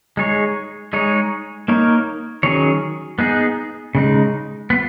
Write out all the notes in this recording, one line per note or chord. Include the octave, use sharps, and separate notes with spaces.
G#3 D#4 G#4 C#5
G#3 D#4 G#4 C#5
A#3 D#4 A#4 C#5
D#3 F#3 C#4 G#4 C#5
B3 D#4 G#4
C#3 G#3 D#4
B3 F4